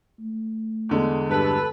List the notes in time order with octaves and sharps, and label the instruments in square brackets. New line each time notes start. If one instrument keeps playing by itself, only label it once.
[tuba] A3
[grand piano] E2 D3 G#3
[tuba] G2 [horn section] A4 B4